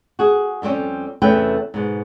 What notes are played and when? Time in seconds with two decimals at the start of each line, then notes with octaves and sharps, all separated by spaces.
0.19 F#4 G#4
0.62 F2 G3 A#3 C4 C#4
1.22 E2 C3 A3 C#4 B4 G5
1.74 G#2 B2